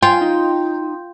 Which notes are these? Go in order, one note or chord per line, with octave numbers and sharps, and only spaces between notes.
F4 G5 G#5 C6 G6
D#4